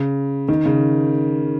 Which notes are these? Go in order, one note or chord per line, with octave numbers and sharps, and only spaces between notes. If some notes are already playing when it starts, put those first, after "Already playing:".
Already playing: C#3
D#3
C#3